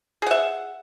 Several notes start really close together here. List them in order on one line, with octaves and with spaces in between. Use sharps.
G#4 F#5 E5